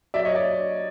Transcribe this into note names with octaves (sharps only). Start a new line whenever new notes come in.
F#3 D5 E5
C#5 D#5
D5